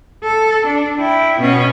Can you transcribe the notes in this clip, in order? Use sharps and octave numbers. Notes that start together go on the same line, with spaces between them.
A4
D4
E4 G5
B2 C#4